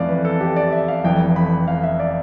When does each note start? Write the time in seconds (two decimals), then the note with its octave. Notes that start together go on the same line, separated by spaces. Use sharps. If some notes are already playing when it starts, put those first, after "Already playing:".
Already playing: F2 E3 A3 D5 F5
0.09 B4
0.25 A4
0.41 G4
0.56 D5
0.72 E5
0.88 F5
1.04 F1 F2 E3 G5
1.36 B5
1.68 F5
1.83 E5
2.00 D5